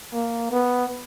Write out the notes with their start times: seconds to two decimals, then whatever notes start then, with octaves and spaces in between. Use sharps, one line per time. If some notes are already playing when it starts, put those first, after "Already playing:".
0.13 A#3
0.51 B3